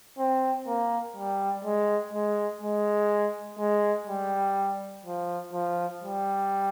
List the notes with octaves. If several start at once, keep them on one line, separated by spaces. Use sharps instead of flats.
C4
A#3
G3
G#3
G#3
G#3
G#3
G3
F3
F3
G3